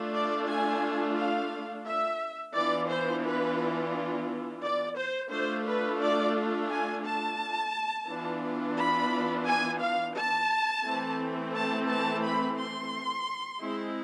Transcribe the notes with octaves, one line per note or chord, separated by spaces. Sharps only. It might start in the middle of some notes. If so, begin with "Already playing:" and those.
Already playing: A3 D4 F4
D5
G#5
F5
E5
E3 B3 D4 F4 D5
C5
B4
D5
C5
A3 D4 F4 C5
B4
D5
G#5
A5
E3 B3 D4 F4
B5
G#5
F5
A5
E3 A3 C4
A5
A5
B5
C6
G#3 C4 E4